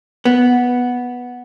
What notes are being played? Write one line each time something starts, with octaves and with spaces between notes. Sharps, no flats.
B3